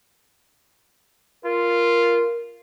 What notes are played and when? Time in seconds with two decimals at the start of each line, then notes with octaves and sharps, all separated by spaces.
1.45 F4 A#4